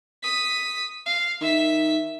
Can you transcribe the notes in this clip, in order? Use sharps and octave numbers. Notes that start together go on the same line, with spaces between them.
D#6 B6
F5
D#3 E5 B6